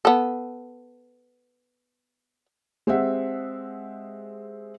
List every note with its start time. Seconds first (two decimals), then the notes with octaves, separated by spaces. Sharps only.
0.05 B3 A4
2.87 G#3 C4 G4 E5 F#5